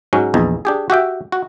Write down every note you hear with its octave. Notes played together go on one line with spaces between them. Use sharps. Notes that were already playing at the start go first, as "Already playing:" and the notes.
G#2 F#3 C#4
A#1 E2 D#4
D4 G4 G#4
F#4 G4 E5 G5
F#4